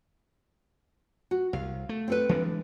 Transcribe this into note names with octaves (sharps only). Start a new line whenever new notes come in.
F#4
C2 F5
A3
C4 A4 B4
E3 G#3 D4